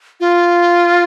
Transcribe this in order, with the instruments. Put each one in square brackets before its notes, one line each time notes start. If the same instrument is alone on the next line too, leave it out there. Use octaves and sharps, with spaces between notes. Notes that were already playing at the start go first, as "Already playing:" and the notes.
[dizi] F4